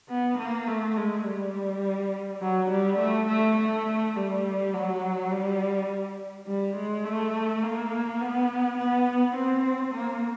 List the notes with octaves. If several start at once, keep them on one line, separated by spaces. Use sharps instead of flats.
B3
A#3
A3
G#3
G3
F#3
G3
A3
A3
A3
G3
F#3
G3
G3
G#3
A3
A#3
B3
B3
C4
A#3